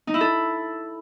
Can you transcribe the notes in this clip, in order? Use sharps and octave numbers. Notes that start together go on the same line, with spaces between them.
D#4
E4
A4